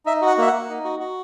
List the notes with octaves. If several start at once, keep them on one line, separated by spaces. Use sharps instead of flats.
D#4 E5
F#4
F#5
A#3 E5
F#5
A#3
D#4
F#4
F#4